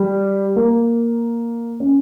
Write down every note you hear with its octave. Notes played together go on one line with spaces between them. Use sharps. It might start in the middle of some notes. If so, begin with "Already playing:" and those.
Already playing: G3
A#3
C#4